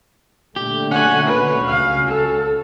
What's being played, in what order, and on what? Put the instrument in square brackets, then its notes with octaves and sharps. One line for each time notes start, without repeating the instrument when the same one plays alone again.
[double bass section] A#2 D3 A3 [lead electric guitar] G4
[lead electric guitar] C#4 F#4 [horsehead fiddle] F#5 G#5
[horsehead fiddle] B4
[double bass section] C#2 [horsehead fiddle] F5
[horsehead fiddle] A4